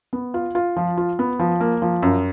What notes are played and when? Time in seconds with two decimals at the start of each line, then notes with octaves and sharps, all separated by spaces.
0.13 B3
0.34 F4
0.55 F4
0.77 F3
0.97 F4
1.19 B3
1.39 F3
1.60 A#3
1.82 F3
2.03 F#2